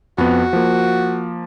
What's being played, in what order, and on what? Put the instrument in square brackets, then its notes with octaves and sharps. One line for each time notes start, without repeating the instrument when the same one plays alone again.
[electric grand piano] F2 B3 [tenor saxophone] F#4
[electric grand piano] F3 A#3